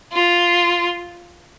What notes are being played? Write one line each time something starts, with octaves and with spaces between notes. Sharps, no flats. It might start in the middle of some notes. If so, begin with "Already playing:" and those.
F4